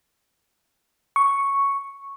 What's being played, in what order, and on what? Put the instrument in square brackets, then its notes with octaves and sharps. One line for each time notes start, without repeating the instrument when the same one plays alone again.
[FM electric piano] C#6